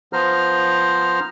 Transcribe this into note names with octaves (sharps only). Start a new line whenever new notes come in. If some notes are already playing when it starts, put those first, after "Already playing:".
F3 B3 C5 A#5 F6